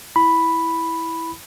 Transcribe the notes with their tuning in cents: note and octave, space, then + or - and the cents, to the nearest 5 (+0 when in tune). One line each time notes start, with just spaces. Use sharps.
E4 +0 B5 +0